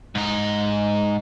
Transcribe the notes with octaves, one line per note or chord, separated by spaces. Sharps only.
G#2 D#4